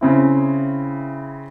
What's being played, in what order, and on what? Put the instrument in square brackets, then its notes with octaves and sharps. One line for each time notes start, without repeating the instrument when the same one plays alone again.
[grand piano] C#3 C4 E4